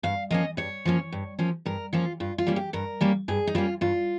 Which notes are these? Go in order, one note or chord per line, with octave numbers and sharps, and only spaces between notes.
G2 F5
F3 A#3 C#4 D#5
G2 C#5
F3 A#3 C#4
G2
F3 A#3 C#4
G2 A#4
F3 A#3 C#4 F4
G2 F4
F4
G3 A#3 C#4
G4
G2 A#4
G3 A#3 C#4
G2 G#4
D#4
G3 A#3 C#4 F4
G2 F4